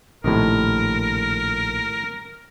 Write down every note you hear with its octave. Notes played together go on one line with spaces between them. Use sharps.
A#1 A2 C3 D#3 A#4